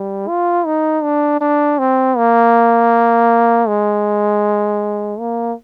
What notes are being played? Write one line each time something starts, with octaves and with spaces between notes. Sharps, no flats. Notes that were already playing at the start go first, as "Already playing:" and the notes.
Already playing: G3
F4
D#4
D4
D4
C4
A#3
G#3
A#3